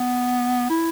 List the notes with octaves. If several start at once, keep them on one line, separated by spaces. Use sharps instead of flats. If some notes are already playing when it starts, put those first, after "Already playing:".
Already playing: B3
E4